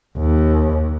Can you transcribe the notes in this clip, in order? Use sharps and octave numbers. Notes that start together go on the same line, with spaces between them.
D#2